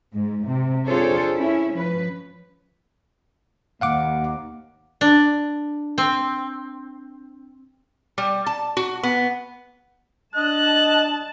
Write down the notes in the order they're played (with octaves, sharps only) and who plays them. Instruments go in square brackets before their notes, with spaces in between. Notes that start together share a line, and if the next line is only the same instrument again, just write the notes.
[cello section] G#2
C3
D4 F4 G#4 A4 C5 C#5
C#4 E4
F3 C#4 B4
[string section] D#2 [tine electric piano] F5 F#5 D6
[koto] D4
C4
[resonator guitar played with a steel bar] G3
A5
F#4
B3
[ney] D4 [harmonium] D#5 [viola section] A5 [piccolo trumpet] F#6